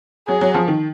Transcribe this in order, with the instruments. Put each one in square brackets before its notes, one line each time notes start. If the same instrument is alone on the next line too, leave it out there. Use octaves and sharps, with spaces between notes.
[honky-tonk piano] F#3 [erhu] G#4
[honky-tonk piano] F#3
F3
D#3